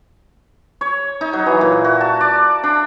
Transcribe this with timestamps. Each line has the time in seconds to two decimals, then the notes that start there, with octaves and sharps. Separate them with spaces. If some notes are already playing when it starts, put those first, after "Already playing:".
0.81 C#5
1.21 D#4
1.33 F#3
1.46 E3
1.61 A#2
1.84 F#4
2.01 A5
2.21 D5
2.63 D4